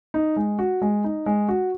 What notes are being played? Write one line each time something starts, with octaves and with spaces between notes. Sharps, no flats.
D#4
G#3
F#4
G#3
D#4
G#3
F#4